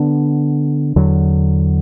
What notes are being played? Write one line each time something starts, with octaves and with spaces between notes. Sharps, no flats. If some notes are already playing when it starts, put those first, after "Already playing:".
Already playing: D3 B3 D4
E2 D3 F#3